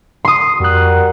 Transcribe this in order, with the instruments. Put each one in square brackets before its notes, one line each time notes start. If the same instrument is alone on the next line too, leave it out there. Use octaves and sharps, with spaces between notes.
[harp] C6 D#6
[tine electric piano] F2 F#6 [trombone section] G3 F#4 A#4